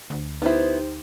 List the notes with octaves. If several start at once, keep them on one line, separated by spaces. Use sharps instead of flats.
D2
B3 D#4 E4 G4 C5